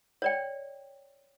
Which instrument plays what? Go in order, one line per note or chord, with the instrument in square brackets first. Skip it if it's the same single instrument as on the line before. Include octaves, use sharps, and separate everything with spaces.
[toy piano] C#5 D5 G5